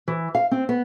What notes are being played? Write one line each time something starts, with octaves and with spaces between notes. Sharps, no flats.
E3
F5
C4
B3